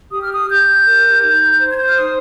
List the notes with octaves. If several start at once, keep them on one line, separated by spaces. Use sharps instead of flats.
G4 D#6
F6
D#6
G4 G6
A#4
D#4
C5
G#6
G6
F6
D#4 D#6